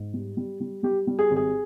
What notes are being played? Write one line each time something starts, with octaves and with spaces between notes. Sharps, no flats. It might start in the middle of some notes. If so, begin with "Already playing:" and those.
Already playing: G#2
G3
G3
G3
G3 G4
G3
G#4
G#1
G#4